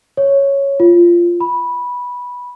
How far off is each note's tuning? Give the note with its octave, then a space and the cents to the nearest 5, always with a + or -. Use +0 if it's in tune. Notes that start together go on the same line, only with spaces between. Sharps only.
C#5 +0
F4 -15
B5 -10